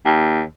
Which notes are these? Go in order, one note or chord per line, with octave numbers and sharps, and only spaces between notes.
D#2